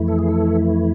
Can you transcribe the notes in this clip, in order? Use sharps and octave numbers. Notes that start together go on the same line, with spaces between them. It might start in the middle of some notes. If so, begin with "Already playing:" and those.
Already playing: F2 E3 A3 E4
A4
G#4
A4